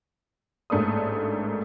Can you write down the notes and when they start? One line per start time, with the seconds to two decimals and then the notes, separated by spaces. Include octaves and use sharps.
0.70 A1 G#2 A3 A#3 D4 D#6